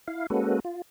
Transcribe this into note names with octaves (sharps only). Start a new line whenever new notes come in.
E4 F5
G#3 A#3 C#4 F#4 A4 B4
F4